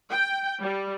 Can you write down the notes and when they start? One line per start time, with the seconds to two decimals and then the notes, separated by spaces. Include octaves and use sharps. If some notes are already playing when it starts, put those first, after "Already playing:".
0.11 G5
0.62 G3